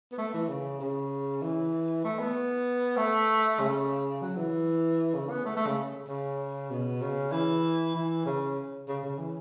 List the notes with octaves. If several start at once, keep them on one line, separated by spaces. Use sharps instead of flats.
B3
A3
E3
C#3
C#3
E3
A3
B3
A3
C#3
F#3
E3
C#3
B3
A3
A3
C#3
C#3
B2
C#3
E3
E3
C#3
C#3
C#3
E3